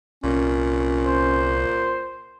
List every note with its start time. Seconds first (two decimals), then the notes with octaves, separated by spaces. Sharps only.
0.24 C2 A#2 C#4
1.07 C5